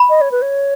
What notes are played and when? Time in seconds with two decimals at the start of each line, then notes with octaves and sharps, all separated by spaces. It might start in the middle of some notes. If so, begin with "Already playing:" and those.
Already playing: B5
0.09 D#5
0.21 C#5
0.32 B4
0.42 C#5